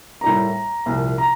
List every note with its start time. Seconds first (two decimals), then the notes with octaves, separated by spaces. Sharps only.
0.21 A2 G3 A#3 A#5
0.86 C2 A#2 F3
1.18 A#5